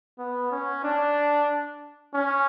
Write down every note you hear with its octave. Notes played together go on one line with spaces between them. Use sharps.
B3
C#4
D4
C#4